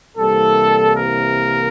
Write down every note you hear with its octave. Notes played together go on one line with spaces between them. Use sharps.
C2 C3 E3 G3 A#3 A4
A#4